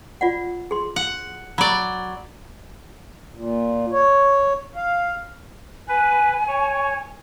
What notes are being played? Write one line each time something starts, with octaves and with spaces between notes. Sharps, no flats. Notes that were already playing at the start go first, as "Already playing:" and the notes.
F4 D5 F#5
G#4 C6
F#5
F#3 D5 B5
A#2
C#5
F5
B4 G#5
C#5